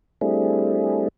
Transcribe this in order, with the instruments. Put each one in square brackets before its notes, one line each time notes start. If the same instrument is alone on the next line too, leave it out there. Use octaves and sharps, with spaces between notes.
[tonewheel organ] G3 A3 C4 D4 E4 G#4